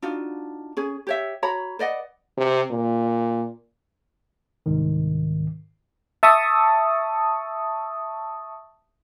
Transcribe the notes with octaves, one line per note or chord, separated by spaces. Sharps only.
D4 D#4 F4 F#4
C#4 G#4
G4 C#5 E5
F#4 C#5 A#5 B5
B4 D5 D#5 F#5
C3
A#2
C2 G#2 D#3
E5 A5 C#6 D#6